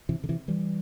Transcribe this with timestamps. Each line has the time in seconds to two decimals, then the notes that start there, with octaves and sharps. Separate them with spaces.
0.09 C3 E3
0.24 D3
0.29 C3 E3
0.48 E3 G3